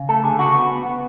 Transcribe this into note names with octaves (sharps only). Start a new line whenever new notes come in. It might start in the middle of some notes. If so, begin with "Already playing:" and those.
Already playing: C#3
A3 A4
D3 G#4
C#3 F#4
B3
B3
B3